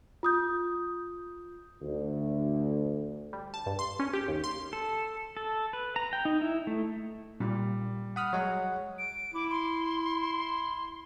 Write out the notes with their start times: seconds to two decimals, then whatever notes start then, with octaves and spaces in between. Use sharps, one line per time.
0.23 F4 D#6 G6
1.82 D2
3.33 G3
3.54 A5
3.66 G2
3.79 C6
3.99 C#4
4.13 G4
4.28 D#2
4.44 C6
4.73 A4
5.37 A4
5.73 B4
5.96 A#5
6.13 G5
6.25 D#4
6.41 E4
6.67 A3
7.40 A#2 G3
8.16 F#5 B5 D#6 F6
8.33 F#3 G#3 C#5 F#5
8.98 D7
9.34 E4 D6
9.50 C6